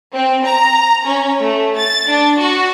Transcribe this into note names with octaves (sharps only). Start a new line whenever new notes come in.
C4
A#5
C#4
A3
A6
D4
F#4